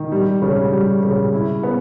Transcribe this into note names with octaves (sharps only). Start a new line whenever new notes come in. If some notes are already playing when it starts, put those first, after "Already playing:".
Already playing: D#3
G3
C#3
G3
C#3
E4
B3